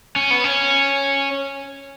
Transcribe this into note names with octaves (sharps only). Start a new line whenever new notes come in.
C#4
B3
C#4